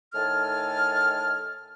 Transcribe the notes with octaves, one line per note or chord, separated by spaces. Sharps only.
A2 D#3 A4 G#5 A5 F6